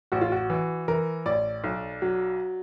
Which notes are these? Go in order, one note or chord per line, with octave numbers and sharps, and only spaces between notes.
A1 F#4
F4
F#4
E3
E3 A#4
A1 D5
B1
F#3